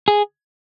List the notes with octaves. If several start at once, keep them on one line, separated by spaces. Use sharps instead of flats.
G#4